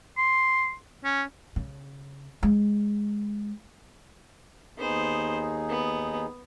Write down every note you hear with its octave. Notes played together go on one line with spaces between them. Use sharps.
C6
C#4
C#3
G#3
D#2 B3 D#4 G#4 C5
B3